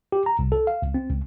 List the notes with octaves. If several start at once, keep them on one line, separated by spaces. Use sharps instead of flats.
G4
A#5
C2
A4
F5
C#2
C4
C#2